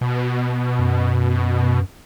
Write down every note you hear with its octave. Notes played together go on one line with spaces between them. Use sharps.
B2
F#2